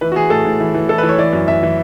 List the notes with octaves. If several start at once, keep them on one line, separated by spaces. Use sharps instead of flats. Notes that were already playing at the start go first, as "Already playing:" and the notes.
E3 B4
F#4
E3 G#4
A2 A4
A2
E3
E3
E3 A4
B4
E3
C#5
E3 D5
F#2
F#2 E5
E3